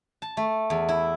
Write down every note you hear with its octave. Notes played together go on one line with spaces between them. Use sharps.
A5
A3
E2
E4